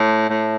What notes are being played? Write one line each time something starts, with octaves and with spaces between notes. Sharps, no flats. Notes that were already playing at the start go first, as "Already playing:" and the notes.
Already playing: A2
A2